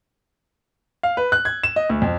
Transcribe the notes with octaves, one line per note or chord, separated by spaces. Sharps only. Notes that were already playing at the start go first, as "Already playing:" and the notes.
F5
B4
F#6
G#6
E7
D#5
D2
F2